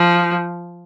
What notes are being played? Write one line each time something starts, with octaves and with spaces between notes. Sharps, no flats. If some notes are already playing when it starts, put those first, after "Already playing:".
Already playing: F3